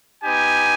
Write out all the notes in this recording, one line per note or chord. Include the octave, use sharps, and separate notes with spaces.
B3 D#4 G4 G#5